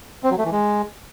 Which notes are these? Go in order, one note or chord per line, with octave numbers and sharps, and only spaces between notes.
C4
F#3
A3
E3
G#3